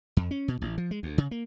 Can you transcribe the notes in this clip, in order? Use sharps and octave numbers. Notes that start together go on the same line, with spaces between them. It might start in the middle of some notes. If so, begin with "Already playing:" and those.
F2
C#4
B2
A1
F3
G#3
D2
C#3
A#3